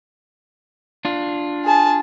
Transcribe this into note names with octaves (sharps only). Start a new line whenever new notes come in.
D4 F4
G#4 A5